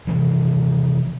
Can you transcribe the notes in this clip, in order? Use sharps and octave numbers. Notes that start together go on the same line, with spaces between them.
C3 E3 F3